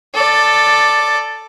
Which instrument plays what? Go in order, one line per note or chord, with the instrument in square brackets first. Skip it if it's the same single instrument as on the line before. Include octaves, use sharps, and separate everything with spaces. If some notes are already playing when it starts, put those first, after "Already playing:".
[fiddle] A4 D5